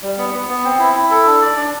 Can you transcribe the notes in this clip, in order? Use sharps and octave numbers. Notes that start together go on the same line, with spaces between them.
G3
B3
B3
B3
C4
E4
E4
A4
D4
D5
D4